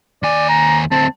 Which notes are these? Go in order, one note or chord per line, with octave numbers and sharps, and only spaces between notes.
D#2 D5 G#5
A#5
D2 C4 A5